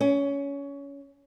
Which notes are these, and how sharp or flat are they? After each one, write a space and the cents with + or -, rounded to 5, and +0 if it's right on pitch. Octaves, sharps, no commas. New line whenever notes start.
C#4 +20